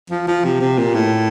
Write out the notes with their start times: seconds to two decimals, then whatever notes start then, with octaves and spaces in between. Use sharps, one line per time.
0.10 F3
0.28 F3
0.45 C3
0.61 C3
0.79 A#2
0.95 A2